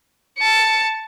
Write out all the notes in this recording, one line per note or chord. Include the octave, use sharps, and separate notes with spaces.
A5 C#7